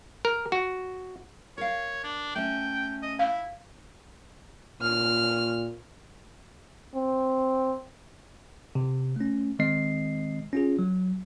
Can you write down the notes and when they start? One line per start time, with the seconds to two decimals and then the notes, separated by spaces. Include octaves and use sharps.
0.25 A#4
0.52 F#4
1.58 A#4 C#5 F5
2.04 D4
2.35 A3 C#4 G5
3.03 D#5
3.19 E4 F5
4.81 A#2 F6
6.95 C4
8.75 C3
9.16 A3 C#4
9.59 D#3 G#3 C4 D#5 C7
10.53 C#4 F4 G#4
10.79 F#3